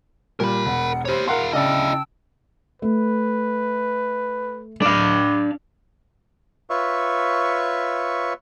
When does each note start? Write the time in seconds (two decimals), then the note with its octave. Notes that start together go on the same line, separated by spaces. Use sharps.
0.40 A#2 G3 A#4 B5
0.65 E1 F#5
1.05 G4 C5 C#5 B5
1.28 E4 A#4 F5 F#5 A#5 C6
1.53 C#3 E4 D5 D#5 G5 A5 E6
2.82 A3 B4
4.82 D4 F5
6.70 F4 B4 C#5 E5 C#6